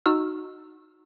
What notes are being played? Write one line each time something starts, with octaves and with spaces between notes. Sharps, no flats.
D#4 F#4 E6 F6